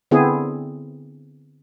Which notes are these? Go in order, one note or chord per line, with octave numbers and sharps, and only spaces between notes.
D3 B3 C4 E4 G#4